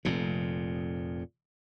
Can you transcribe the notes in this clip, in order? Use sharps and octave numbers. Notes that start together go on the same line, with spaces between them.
F1 F2 A#2